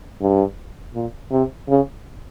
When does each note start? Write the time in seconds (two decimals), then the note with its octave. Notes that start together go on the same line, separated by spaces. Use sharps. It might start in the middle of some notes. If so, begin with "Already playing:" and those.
0.21 G2
0.94 A#2
1.31 C3
1.68 C#3